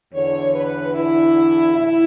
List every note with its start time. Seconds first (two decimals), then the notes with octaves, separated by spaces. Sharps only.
0.13 E2 D3 C#5
0.55 B4
0.95 E4
1.75 A2 E4